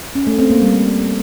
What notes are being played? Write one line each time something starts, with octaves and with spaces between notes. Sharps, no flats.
C#4
A3
C4
A#3
G3